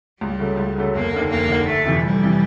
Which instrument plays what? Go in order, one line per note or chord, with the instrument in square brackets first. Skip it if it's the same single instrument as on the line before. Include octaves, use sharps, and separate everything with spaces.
[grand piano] C#2 [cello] G3
[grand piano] C#3 F#3 A3
C#2
C#3 F#3 A3
[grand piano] F1 [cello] A#3
[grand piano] D#2 D3
[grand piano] F1 [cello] A#3
[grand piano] D#2 D3
[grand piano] F1 [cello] A3
[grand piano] F2 C3 E3
[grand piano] F1 [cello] G3
[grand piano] C3 E3